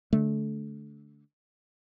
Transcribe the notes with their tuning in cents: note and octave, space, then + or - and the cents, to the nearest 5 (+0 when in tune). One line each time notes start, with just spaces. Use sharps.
D3 -20 A3 -25